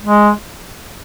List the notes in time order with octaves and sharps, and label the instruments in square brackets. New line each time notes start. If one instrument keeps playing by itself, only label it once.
[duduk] G#3